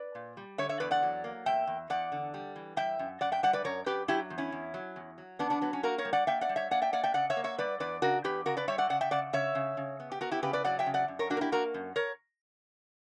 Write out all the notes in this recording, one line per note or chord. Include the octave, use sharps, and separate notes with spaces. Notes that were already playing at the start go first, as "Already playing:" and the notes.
Already playing: B4 D5
A#2
G3
D3 C#5 E5
C#5 E5
E2 B4 D5
D5 F#5
F#3
A#3
E2 E5 G5
E2
E2 D5 F#5
D3
G3
E3
G3 E5 G5
F#2
F#2 D5 F#5
E5 G5
G3 D5 F#5
B4 D5
F#2 A#4 C#5
F#2 G4 B4
F#3 E4 G4
E2
C#4 E4
E2
F#3
E2
F#3
E2 B3 D4
B3 D4
F#3 B3
C#4
A#3 F#4 A#4
A#4 C#5
G3
D5 F#5
A#3 E5 G5
D5 F#5
G3
C#5 E5
A#3 D5 F#5
E5 G5
A#3 D5 F#5
E5 G5
C#3 D5 F#5
C#5 E5
A#3
C#5 E5
G3 B4 D5
E2 B4 D5
C#3 F#4 A#4
E2 G4 B4
C#3 F#4 A#4
B4 D5
G3 C#5 E5
D5 F#5
C#3 D5 F#5
E5 G5
C#3 D5 F#5
C#3 C#5 E5
C#3
C#3
B3
G4
B3 F#4 A#4
E4 G4
C#3 G4 B4
B4 D5
F#3 D5 F#5
E5 G5
C#3
D5 F#5
F#2
A#4 C#5
A#3 D4 F#4
A#4
E4 G4
A#3 F#4 A#4
F#2
A#4 C#5